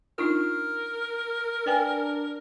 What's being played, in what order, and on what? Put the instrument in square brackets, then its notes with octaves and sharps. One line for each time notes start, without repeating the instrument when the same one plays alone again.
[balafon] D4 D#4 F4 [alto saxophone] A#4
[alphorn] D4 [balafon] B4 G5 G#5